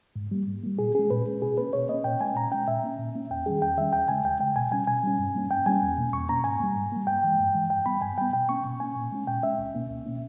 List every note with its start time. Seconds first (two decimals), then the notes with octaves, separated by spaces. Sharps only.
0.16 G#2
0.31 G3 A#3
0.48 G#2
0.63 G3 A#3
0.79 A#2 G#4
0.95 G#3 C#4 G#4
1.10 A#2 B4
1.27 G#3 C#4
1.42 B2 G#4
1.58 A#3 C#4 B4
1.73 B2 C#5
1.89 A#3 C#4 D#5
2.04 A#2 G5
2.20 G#3 C#4 G#5
2.36 A#2 A#5
2.52 G#3 C#4 G5
2.68 A#2 E5
2.83 A#3 C#4
2.99 A#2
3.15 A#3 C#4
3.30 E2 G5
3.46 D#3 G3 C#4 G#4
3.62 E2 G5
3.77 D#3 G3 C#4 E5
3.93 D#2 G5
4.08 C#3 G#3 G#5
4.24 D#2 G5
4.40 C#3 G#3 G5
4.56 B2 G#5
4.71 G3 C#4 G#5
4.87 B2 G#5
5.03 G3 C#4
5.19 G2
5.35 G3 A#3 C#4
5.50 G2 G5
5.66 G3 A#3 C#4 G#5
5.82 E2
5.97 B2 A#3 C#4
6.13 E2 C#6
6.29 B2 A#3 C#4 A#5
6.44 G#2 G#5
6.60 G3 A#3
6.76 G#2
6.92 G3 A#3
7.07 G2 G5
7.23 E3 G#3
7.39 G2
7.55 E3 G#3
7.70 G2 G5
7.86 G3 B3 B5
8.02 G2 G#5
8.18 G3 B3 G5
8.33 B2 G5
8.49 A#3 C#4 C#6
8.64 B2
8.80 A#3 C#4 G#5
8.96 A#2
9.12 G#3 C#4
9.27 A#2 G5
9.43 G#3 C#4 E5
9.58 C#2
9.75 B2 A#3 C#4
9.90 C#2
10.06 B2 A#3 C#4